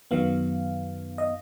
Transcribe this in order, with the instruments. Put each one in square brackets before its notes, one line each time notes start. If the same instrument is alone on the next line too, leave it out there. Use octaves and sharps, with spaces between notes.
[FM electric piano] F#2 D#3 F#3 B3 F5
D#5